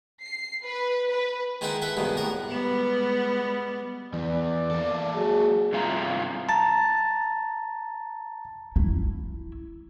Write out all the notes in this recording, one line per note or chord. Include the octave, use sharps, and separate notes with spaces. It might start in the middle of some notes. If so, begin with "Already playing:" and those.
C7
B4
B4
D#3 G#3 D#4 E4 F#5 G5
A4 B4 E5 F#5
C2 G2 B2 D#3 G#3
A2 A#4 F#5
G3 G#3 B3
E2 E3 D5
A#3 A4
F#3 G#4
G2 C3 F4 G4 E5 A#5
A5 A#5 A6
E4